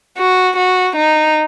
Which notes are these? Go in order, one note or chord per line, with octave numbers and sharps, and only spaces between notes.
F#4
F#4
D#4